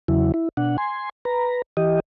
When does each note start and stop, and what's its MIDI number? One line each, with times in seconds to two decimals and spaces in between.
0.08 0.32 40
0.08 0.32 49
0.08 0.32 54
0.08 0.32 64
0.34 0.49 64
0.57 0.77 47
0.57 0.77 62
0.57 0.77 78
0.78 1.09 80
0.78 1.09 84
1.25 1.62 71
1.25 1.62 82
1.77 2.00 52
1.77 2.00 67
1.77 2.00 75